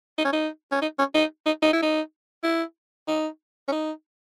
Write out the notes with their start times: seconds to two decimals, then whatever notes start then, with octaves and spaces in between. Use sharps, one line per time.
0.18 D#4
0.25 C#4
0.33 D#4
0.72 C#4
0.82 D#4
0.99 C#4
1.14 D#4
1.46 D#4
1.63 D#4
1.73 E4
1.83 D#4
2.43 E4
3.08 D#4
3.68 C#4
3.72 D#4